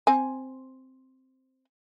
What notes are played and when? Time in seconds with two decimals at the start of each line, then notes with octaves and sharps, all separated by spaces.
0.07 C4 G#5